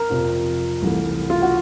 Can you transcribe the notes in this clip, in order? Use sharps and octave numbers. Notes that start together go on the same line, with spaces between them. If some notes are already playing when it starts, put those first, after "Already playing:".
Already playing: A#4
F2 C3 F3
C2 C3 E3 A3
F4
F#4